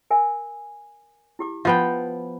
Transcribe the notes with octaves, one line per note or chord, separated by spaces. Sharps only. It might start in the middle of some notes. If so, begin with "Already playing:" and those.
A#4 E5 G#5
E4 G4 D6
F3 B3 E5 G5